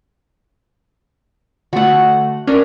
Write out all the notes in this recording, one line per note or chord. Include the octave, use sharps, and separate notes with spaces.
D3 A3 F#4 F#5
C#4 D4 A#4